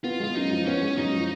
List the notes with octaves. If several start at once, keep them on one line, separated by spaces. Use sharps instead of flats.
B3 F4
G#3 F4
F#2 D#4
F3
B3 C#4
G#3
F#2 D#4
F3